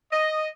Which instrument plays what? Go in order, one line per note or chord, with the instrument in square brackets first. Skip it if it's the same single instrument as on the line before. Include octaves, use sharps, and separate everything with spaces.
[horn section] D#5